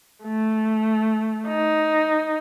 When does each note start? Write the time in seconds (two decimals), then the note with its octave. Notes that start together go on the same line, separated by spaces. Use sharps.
0.24 A3
1.48 D#4